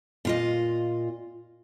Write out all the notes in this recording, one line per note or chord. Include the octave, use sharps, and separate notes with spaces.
A#2 F4 D#5